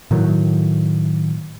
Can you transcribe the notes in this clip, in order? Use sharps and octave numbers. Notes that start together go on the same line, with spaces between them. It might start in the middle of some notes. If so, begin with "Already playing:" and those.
A2 D#3 F#3